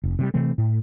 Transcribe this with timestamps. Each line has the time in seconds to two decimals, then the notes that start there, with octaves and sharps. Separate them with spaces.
0.04 F1
0.19 C3 F#3 G3
0.34 C3 E3 A3 C4
0.58 A2